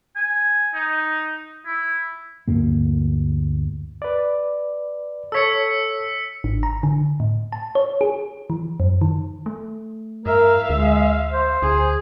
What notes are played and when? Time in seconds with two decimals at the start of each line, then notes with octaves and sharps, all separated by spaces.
0.16 G#5
0.75 D#4
1.66 E4
2.48 D2 G2 A#3
4.02 B4 D5
5.32 A4 C#5 E6 B6 C#7
6.44 G#1
6.63 A#5
6.83 D3
7.20 A2
7.52 A5
7.75 C#5
8.01 G#4
8.50 E3
8.80 F#2
9.01 D#3
9.46 A3
10.26 G2 A#4 E5 F5
10.70 D2 G#3
11.32 C5
11.62 D2 G#4